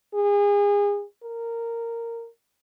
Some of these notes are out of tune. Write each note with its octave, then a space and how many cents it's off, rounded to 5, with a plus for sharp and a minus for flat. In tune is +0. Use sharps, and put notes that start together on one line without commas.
G#4 -30
A#4 -10